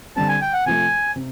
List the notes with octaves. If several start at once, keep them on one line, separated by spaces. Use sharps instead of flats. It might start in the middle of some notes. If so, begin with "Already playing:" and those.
D3 G3 C4 A5
G#5
G5
F#5
C3 F3 A3 G#5
C3